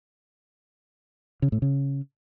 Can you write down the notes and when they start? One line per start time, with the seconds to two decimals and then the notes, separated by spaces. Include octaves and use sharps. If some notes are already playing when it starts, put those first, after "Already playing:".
1.42 C#3
1.52 A2
1.62 C#3